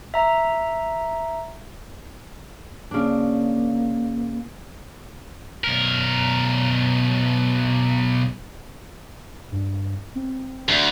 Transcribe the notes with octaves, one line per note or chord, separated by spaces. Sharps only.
E5 A#5
C#3 A#3 D4
B1 A#4
G2
C4
D2